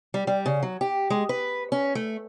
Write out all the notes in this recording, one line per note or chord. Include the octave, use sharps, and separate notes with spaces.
G3
G3
C#3
F#3
G4
G#3
B4
C#4
A3